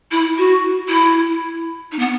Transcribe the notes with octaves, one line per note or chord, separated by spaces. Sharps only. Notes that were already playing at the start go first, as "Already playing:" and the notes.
E4
F#4
E4
D#4
B3